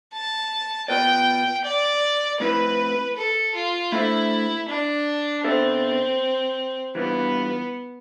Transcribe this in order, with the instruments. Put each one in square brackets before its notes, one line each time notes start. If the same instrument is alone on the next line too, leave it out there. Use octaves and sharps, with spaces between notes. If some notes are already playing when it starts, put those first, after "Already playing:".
[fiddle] A5
[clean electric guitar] B2 B3 F4 B4 D5 [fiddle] G5
[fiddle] D5
[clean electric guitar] A2 F3 C4 E4 [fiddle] B4
[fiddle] A4
F4
[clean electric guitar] A3 D4 A4 C5 E5 [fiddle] E4
[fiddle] D4
[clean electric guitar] B2 B3 D4 A4 E5 [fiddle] C4
[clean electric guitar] E3 G3 D4 F4 B4 [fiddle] B3